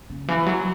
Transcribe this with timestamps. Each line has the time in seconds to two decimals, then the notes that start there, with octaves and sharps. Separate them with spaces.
0.10 C#3
0.28 E3
0.46 F#3